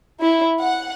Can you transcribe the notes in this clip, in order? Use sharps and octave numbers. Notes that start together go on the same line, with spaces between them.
E4
F#5